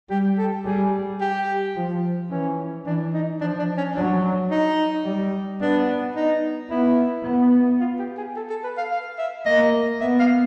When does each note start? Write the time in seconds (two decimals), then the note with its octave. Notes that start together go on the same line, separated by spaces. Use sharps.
0.10 G3 G4
0.38 A4
0.65 G3 G#4
1.20 G4
1.76 F3
2.31 E3 C#4
2.86 E3 D4
3.13 D#4
3.41 F3 D4
3.59 D4
3.77 C#4
3.95 F#3 D4
4.51 D#4
5.06 G3
5.61 B3 D4
6.16 D#4
6.70 B3 E4
7.26 B3
7.80 F4
7.99 G4
8.17 G#4
8.36 A4
8.50 A4
8.64 B4
8.78 F5
8.91 F5
9.18 E5
9.46 A#3 D#5
10.01 B3 E5
10.19 F5